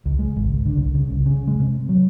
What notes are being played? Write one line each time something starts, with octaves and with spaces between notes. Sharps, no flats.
C#2
G#3
G#1
C#2
D3
C2
C#3
C2
C#3
G#3
C3
F#3